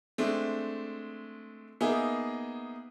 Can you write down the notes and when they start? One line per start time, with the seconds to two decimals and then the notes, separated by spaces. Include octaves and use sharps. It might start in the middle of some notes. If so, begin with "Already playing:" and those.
0.18 G#3 A3 C4 D4
1.81 A#3 B3 D#4 G#4 E5